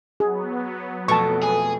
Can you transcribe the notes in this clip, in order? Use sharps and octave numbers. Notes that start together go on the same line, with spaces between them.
F#3 B3 G#4
F2 B2 A3 A5 C#6
G#4